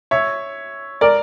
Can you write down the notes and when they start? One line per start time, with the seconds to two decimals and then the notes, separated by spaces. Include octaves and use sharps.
0.11 C#5 E5
1.01 A#4 D5